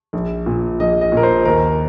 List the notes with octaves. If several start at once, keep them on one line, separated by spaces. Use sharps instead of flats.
A#1
A#2
A#1 D#5
D#5
A#2
A#4
C5
D#2 A#4